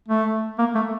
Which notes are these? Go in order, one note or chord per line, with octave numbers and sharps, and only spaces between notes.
A3
A#3
A3